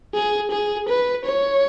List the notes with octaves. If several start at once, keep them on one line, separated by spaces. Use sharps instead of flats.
G#4
G#4
B4
C#5